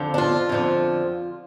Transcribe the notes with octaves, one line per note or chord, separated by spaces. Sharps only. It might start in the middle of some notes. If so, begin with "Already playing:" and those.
Already playing: F2 D3 F3
D4
F4
F2 D3 F3